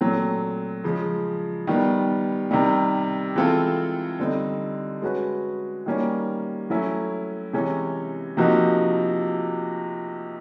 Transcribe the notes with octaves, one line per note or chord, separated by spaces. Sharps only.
A#2 F#3 A3 C4
C#3 F3 G#3
D#3 G3 B3
C3 D#3 G3
E3 G#3 C4 F4 A4
D3 G3 C4 D#4
G#3 C#4 F#4 B4
D#3 G3 A#3 C#4
F#3 A3 C#4 E4
C3 E3 G#3 C#4
C3 F3 A#3 D#4 F#4